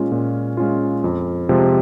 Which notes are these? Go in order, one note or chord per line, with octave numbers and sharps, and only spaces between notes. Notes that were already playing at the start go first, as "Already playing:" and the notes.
Already playing: A#2 G#3 C#4 F4
A#2
G#3 C#4 F4
F2
C3 F3 G#3